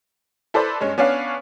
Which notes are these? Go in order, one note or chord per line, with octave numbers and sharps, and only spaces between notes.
E4 A4 B4 C5 D5
G2 G#3 C#4
B3 C#4 D4 C#5 F5